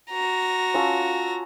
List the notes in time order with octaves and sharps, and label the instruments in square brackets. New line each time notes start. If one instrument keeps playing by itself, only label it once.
[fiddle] F#4 A#5
[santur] C#4 F4 A4